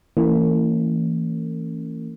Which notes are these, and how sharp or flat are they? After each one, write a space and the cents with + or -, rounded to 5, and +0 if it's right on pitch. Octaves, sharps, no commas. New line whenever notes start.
E3 +0 A#3 -40 C#4 +0